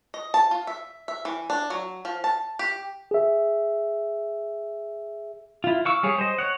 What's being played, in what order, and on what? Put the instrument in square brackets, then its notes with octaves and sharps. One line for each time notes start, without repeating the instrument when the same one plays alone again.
[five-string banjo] D#5
A5
F4
E5
E5
E3
D4
F#3
F3
A5
G4
[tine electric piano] G#4 E5
[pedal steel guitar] E4 F4
F5 C#6 E6
G3 G#4 C#5
C5 D#5
C#5 F#5